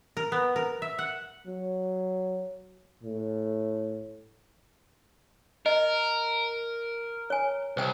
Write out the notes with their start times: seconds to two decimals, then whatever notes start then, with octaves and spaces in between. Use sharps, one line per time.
0.17 A#4
0.32 B3
0.56 A#4
0.82 E5
0.99 F#5
1.47 F#3
3.03 A2
5.66 A#4 D#5
7.30 C#5 G#5
7.77 C2 C5 G5